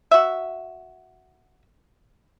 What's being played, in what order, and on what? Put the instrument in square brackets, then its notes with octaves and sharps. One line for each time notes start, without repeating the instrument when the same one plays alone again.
[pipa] F#4 E5